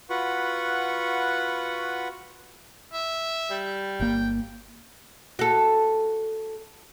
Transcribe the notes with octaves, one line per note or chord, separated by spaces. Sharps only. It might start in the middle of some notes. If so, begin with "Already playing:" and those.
F4 F#4 B4 F#5 B5 C#6
E5
G3
G1 A#3 G5
F#4 A4